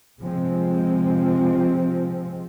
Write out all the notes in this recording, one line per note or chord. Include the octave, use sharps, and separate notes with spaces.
C3 F3 G#3 C4